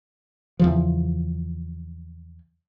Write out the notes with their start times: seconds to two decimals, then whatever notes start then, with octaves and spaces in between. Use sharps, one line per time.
0.59 E2 C#3 F3